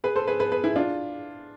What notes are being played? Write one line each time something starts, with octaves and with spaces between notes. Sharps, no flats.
G#4 B4
A4 C5
G#4 B4
G#4 B4
G#4 B4
E4 G#4
D4 F4